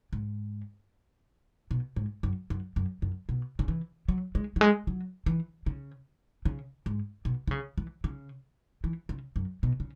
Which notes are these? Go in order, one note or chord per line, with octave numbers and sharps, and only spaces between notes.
G#2
B2
G#2
F#2
F#2
F#2
F#2
B2
C#3
E3
F#3
G#3
F#3
G#3
F#3
E3
C#3
C#3
G#2
B2
E3
C#3
E3
C#3
E3
C#3
F#2
B2
C#3